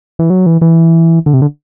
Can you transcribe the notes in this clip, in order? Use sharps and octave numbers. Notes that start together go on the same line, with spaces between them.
E3
F#3
E3
E3
D3
C3
D3